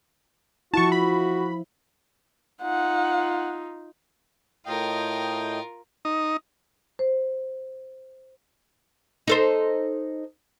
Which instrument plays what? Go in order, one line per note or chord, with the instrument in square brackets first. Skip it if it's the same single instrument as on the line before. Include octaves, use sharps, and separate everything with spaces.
[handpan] F3 E4 [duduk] F#4 [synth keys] A5 C#6
[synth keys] B5
[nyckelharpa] D#4 F4 [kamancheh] F#5
[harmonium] A2 D#5 G5 [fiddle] F4 A#4
[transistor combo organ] D#4
[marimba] C5
[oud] D#4 A4 C5